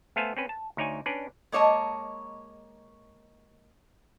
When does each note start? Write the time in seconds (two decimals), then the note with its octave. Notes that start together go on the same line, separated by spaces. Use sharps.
0.16 A3 B3 A4 C5 F5 G#5
0.37 C4 C#4 B4
0.49 A5
0.77 D2 D#4 C#5 D5 G#5
1.06 C#4 D4 B4 D5
1.52 G#3 A#3 C#5 D#5 A5